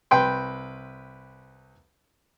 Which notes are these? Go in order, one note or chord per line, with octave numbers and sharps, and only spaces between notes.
C2 B4 G5 C6